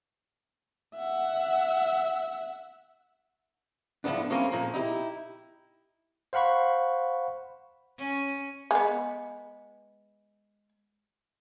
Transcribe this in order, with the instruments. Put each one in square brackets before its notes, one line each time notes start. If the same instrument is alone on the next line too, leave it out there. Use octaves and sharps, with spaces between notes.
[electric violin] E5 F#5
[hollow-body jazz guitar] A2 F3 A3 B3 D4
G3 A3 A#3 C4 C#4
A#2 F3
D#4 E4 G4
[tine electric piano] C5 F5 F#5 B5 C#6
[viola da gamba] C#4
[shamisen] G#3 B3